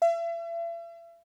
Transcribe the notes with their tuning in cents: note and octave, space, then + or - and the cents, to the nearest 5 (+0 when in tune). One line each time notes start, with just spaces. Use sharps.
E5 +40